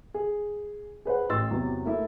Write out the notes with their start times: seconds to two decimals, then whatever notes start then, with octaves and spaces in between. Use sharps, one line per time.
0.14 G#4
1.05 G#4 B4 C5 F#5
1.29 A1 C6 E6 A6
1.51 E2 C3 F#3
1.86 A3 A#3 E4 E5